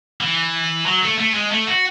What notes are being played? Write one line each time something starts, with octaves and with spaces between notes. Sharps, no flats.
E3
F#3
A3
A3
G#3
A3
F#4